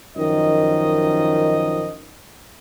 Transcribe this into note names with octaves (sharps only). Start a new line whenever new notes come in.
F#2 D#3 F3 D#5